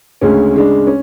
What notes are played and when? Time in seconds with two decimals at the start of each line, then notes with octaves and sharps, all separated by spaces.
0.21 D2 C#3 G#3 C#4
0.54 C#3 G#3 D4
0.87 C#4